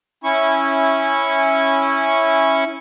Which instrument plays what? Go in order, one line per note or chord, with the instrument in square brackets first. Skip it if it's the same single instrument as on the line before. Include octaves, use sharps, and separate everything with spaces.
[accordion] C#4 E4 C#6